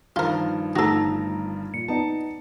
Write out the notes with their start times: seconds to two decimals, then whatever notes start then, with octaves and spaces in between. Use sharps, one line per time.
0.16 G2 D#3 F3 F4 A#4
0.76 G1 A3 D#4 F#4 A4 A#5
1.74 A#2 C#7
1.88 B3 D#4 D5 A5